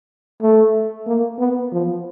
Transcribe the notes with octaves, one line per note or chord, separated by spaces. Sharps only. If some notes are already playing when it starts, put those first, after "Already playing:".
A3
A#3
B3
F3